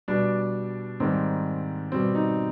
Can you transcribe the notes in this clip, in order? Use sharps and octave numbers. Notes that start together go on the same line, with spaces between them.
B2 G3 D4
G#2 D#3 G3 C4
B2 G3 C4
D#4